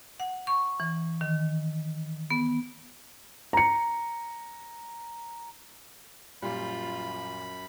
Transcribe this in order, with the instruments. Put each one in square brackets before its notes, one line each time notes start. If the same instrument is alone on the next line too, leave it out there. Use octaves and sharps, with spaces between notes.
[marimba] F#5
C#6
E3
D#3
B3
[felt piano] A#5 C#7
[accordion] F#2 B5 [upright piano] A#2 G3 [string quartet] F4